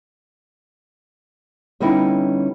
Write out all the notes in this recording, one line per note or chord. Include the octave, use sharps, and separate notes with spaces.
D3 G3 B3 C#4 D#4 E4